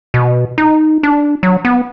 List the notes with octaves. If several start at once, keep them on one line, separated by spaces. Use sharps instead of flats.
B2
D#4
D4
F#3
B3